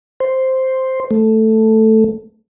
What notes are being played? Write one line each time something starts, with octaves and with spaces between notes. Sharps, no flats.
C5
A3